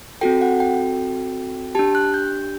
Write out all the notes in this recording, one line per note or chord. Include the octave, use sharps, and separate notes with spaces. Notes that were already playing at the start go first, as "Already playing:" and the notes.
C4 F#4 A4 G5
F#5
G5
D4 G4 A5
F#6
G6